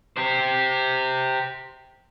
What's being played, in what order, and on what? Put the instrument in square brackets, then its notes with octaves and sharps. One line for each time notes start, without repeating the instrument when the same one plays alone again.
[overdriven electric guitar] G4 C5